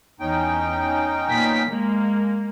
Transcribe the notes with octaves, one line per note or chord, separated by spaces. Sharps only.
E2 C#4 D#4 G5
A#2 B3 B6
G#3 A#3